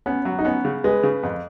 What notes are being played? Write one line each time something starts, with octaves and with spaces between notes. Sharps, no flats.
B3 C#4
F#3
D#4
B3 C#4
C#3
G#3 B4
C#3
F2